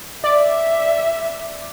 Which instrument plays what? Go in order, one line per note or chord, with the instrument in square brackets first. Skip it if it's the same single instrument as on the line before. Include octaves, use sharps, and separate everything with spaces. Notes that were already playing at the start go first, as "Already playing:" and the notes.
[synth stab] D5 [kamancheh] E5